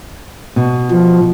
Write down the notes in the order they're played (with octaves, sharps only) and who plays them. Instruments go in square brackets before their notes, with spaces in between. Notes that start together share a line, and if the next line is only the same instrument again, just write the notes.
[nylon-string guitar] B2
[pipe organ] F3